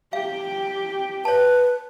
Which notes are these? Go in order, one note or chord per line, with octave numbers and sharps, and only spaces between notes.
G4 F5 G5
B4 C#5 A5